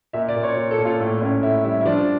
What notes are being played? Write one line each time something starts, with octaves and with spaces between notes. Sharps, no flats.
A#2 E5
D5
A#2
C#5
A#2
A4
A#2
F4
A2
A2 C#4
A2 E4
G3 E4
E4
F3 D4